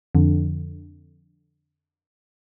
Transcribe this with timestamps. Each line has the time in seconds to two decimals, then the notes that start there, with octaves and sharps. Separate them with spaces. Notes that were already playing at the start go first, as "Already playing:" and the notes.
0.15 F2 D3